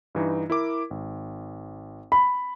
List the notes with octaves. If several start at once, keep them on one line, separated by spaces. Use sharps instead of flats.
G2 E3 D#4
E4 A#4 D6
G#1
B5